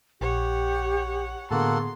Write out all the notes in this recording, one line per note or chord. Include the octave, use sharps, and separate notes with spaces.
A#1 G4 C#5 F#5
A2 D3 A#3 B3 F#4 G#4 A4 C6